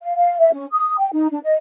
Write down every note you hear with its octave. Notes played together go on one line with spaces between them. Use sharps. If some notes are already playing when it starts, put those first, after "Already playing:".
F5
F5
E5
C#4
D#6
G5
D#4
D4
D#5